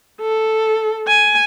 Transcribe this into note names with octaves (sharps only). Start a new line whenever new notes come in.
A4
G#5